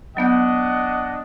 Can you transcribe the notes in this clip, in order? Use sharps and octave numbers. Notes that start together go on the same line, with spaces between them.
F#3 B3 D4 D#5 F#5 G6